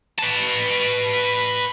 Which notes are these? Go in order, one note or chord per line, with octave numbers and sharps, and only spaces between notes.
B4 A5